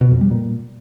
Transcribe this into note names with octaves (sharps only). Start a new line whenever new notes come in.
B2
F2
G3
A#2